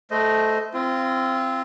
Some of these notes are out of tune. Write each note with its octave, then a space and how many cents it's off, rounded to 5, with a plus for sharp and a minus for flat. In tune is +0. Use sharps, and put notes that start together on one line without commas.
A3 -15 C5 -25 D#5 +0
C4 +0 F4 -30